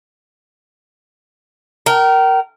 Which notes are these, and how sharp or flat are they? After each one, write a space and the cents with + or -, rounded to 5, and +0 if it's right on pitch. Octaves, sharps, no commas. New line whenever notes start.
A#4 +0 G5 -35